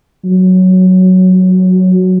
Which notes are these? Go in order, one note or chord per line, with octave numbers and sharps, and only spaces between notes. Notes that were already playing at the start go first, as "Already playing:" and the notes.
F#3